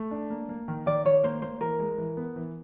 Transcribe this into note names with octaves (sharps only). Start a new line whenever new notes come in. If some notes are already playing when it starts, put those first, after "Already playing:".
Already playing: A3
D4
A#3
A#3
D#3
D#3 D5
D#3 C#5
A#3 C5
A#3 C5
E3 A#4
G#3
E3
B3
E3